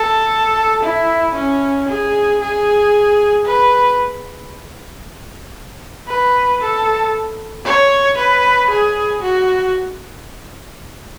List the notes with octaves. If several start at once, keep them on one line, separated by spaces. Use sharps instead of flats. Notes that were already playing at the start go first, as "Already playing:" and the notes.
Already playing: A4
E4
C#4
G#4
G#4
B4
B4
A4
C#5
B4
G#4
F#4